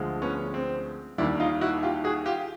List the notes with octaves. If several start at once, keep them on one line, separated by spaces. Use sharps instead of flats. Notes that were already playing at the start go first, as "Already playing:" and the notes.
Already playing: D2 D3 F3 G#3
B3 C#4
C4
D#2 D#3 G3 D4 E4
D#4 F4
E4 F#4
F4 G4
F#4 G#4
F4 G4